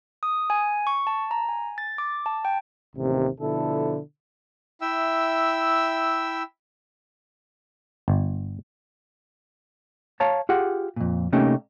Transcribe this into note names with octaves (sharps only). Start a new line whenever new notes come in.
D#6
G#5
C#6
A5
A#5
G#5
A6
D6
A5
G5
A1 D#2 C3
B2 D3 F3 E4 A4
E4 E5 G5 E6
G1
C#5 F5 A5 A#5
F4 G4 G#4 F#5
F2 A#2
C3 A3 A#3 C#4 D#4 G4